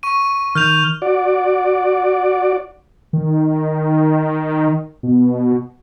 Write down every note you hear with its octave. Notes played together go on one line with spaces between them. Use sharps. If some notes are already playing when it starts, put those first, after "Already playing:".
C#6 D#7
D#3 F6 G6 F7
F#4 D5
D#3
B2